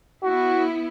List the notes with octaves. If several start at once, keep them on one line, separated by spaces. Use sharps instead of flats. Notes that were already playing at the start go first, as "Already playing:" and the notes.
B3 E4 F#4